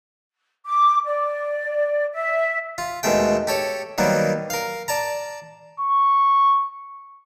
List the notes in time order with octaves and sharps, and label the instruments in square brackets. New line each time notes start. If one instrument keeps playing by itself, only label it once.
[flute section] D6
D5
E5
[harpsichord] F4
D#2 B2 G#3 A3 G5
G4 A4 C#5
D#3 F#3 G3 A#3 B3
A#4 F5
D5 A5 A#5
[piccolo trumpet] C#6